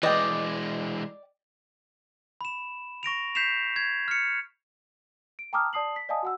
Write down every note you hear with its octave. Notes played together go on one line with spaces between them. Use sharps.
E3 G#3 B4 D5 D#5 G5
B5 E7
C#6 A#6 D7 F7
G6 B6 C7 E7 F7
G#6
F6 C#7
D7
G5 A5 A#5 D6 D#6 F6
D5 A5 D#6 C7 F#7
B6
D5 D#5 F5 G#5 A5 D#6
F#4 F#5 E6